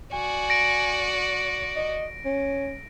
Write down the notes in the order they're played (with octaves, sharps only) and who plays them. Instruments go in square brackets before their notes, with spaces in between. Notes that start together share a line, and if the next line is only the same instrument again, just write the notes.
[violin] F#4 D5 [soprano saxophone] G#5
[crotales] A#6 D7
[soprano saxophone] D#5
C#4